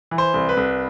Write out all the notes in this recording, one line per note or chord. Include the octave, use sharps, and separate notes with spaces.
E3
C5
C2
B4
C2